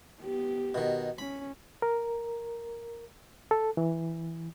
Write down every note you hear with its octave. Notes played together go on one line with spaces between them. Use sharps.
B3 G4
B2 D#3
C#4 B5
A#4
A4
E3